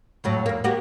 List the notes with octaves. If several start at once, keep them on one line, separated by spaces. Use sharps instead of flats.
F2 A2 F#3
E2 A#3
A#3 F#4 G4